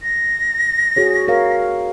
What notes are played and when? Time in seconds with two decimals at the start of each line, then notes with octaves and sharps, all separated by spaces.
0.02 A#6
0.97 F#4 G#4 C#5
1.28 A#4 C#5 F5